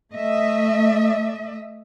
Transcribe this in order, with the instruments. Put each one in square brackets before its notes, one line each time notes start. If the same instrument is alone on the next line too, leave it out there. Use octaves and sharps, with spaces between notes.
[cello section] A3 D#5 E5